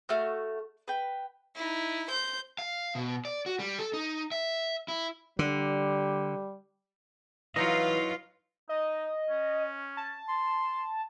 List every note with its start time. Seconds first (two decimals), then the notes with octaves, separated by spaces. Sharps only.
0.09 A3 F#4 F6 G6
0.88 B4 G5
1.56 D#4 E4
2.10 C5 G6
2.59 F5
2.95 B2
3.25 D5
3.46 F#4
3.59 G3
3.79 A4
3.93 D#4
4.32 E5
4.88 E4
5.39 D3 G3
7.56 E3 F#3 D#4 F4 B4 D#5 F5
8.69 D#4 D#5
9.30 C#4
9.97 A5
10.28 C6